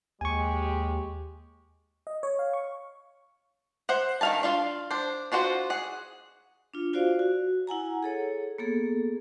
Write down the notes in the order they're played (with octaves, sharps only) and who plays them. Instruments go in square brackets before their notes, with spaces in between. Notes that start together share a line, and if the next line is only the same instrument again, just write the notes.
[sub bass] D#2 [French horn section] G#3 G4 [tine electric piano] G#5 C#6
[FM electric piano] D#5
C#5
F5
C#6
[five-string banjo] C5 E5 F#5
D#3 C#4 F5 G#5 A5
D4 F4 F5
D4 C5
D4 F4 F#4 B4 C5
G#4 F#5
[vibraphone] D4 F4
F4 F#4 C5 D5 F5
F#4
E4 F#5 G#5 A#5
G#4 A4 C#5
A#3 B3 G#4 A4